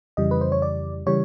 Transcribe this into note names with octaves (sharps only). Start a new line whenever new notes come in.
F2 C#3 E3 G3 D#5
B4
C5
C#5
D5
C#3 E3 G3 C#5